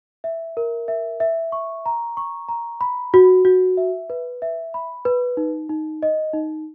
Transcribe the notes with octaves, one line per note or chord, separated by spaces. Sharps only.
E5
A#4
E5
E5
C#6
A#5
C#6
A#5
B5
F#4
F#4
E5
B4
E5
B5
B4
D#4
D#4
D#5
D#4